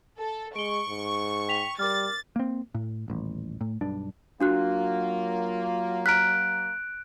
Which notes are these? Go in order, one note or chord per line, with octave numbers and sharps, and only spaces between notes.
A4
G#3 C#6 D7 G7
G#2
G5 B6 F7
G3 A#4 D6 F6 A6
A#3 C4
A2
D#1 A1
A2
B1 G2 D4
F#3 A#3 D4 F4 F#4 F#6
A#5 F6 F#6 B6 D7